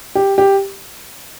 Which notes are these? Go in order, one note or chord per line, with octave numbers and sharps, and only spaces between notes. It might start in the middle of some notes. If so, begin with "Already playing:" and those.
G4
G4